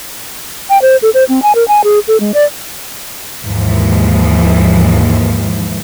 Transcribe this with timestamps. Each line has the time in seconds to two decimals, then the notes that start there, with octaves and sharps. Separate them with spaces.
0.70 G5
0.82 C5
1.02 A4
1.14 C5
1.29 C4
1.42 G#5
1.55 A#4
1.68 G#5
1.84 G#4
2.08 A4
2.20 G#3
2.34 D5
3.44 D#2 G#2 E3 F3